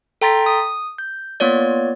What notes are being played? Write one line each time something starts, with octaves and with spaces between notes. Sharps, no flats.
A4 G5 A#5 C6 A6 B6
D#6
G6
A#3 B3 F4 C#5 D5